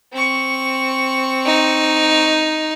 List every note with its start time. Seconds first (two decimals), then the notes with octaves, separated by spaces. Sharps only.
0.13 C4 C#6
1.46 D#4